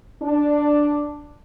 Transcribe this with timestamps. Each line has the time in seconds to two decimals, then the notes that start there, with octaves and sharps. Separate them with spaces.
0.22 D4